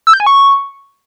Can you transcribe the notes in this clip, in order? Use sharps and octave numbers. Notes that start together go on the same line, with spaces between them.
E6
G6
G#5
C#6